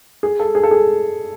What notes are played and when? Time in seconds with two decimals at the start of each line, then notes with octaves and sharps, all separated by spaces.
0.23 G#4
0.40 A4
0.55 G#4
0.63 A4
0.71 G#4